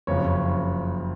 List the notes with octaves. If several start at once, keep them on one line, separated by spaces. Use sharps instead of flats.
F#1 F2 C#3 C#5